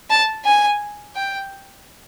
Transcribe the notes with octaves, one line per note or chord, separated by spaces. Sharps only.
A5
G#5
G5